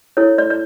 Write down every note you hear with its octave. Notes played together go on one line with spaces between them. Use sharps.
E4 A4 C#5
D5
D5